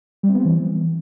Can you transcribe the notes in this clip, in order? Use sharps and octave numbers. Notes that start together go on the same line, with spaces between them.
G3
C4
B3
C4
E3